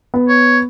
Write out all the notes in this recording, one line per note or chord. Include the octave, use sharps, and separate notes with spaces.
B3
C#5